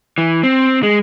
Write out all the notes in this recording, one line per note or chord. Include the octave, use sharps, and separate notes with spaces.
E3
C4
G#3